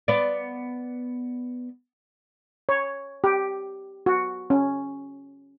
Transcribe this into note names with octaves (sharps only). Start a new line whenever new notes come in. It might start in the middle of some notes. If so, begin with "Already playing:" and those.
B3 D5
C#5
G4
F#4
C#4